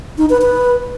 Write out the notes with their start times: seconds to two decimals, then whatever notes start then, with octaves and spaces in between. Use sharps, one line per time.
0.18 D#4
0.30 B4
0.42 B4